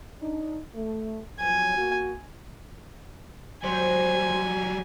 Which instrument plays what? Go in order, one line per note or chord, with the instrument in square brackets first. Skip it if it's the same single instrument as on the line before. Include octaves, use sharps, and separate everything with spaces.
[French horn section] D4 D#4
A3
[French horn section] F3 F#3 [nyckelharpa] G#5
[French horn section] A#3 F#4
[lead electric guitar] F#3 G3 [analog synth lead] C5 [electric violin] G#5